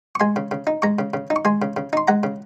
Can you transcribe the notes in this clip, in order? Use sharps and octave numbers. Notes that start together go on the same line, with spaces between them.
C#6
G#3 G#5 C6
C#3
C#3
D#4
G#3 A#5 C#6
C#3
C#3
D#4
C#6
G#3 G#5 C6
C#3
C#3
D#4 C6
G#3 F#5 A#5
C#3